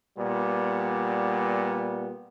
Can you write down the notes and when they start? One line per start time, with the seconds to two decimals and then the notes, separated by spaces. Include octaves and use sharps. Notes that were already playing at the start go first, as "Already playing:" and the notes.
0.19 A#2 G3 B3